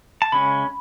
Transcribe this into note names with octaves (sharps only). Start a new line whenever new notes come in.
A5
C#3 G#3 C#4 B5